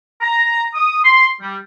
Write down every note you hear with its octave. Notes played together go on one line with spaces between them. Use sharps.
A#5
D#6
C6
G3